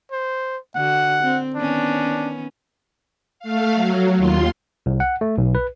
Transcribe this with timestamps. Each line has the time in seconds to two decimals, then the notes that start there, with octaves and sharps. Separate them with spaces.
0.12 C5
0.76 D3 F#4 F#5
1.22 C4
1.55 D#3 B3 C#4 D4
3.40 A3 F5
3.74 F#3
4.17 D#2 F4 C6
4.86 C2
5.00 F#5
5.21 A3
5.38 B1
5.55 B4